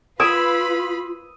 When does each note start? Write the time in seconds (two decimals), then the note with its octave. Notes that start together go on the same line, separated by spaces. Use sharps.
0.20 F4 B4 F5 B5 D#6 E6 G#6 D7